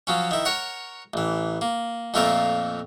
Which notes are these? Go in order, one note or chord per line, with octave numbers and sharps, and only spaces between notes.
F3 F#3 C#4
D#3 E4
A#4 C#5 F#5
A1 E3
A#3
F2 A#2 A3 C4 F4 A#4